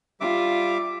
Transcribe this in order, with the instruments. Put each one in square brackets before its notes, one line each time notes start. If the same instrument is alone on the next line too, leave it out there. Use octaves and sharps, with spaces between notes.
[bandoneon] G3 E5 D6 [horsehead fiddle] F4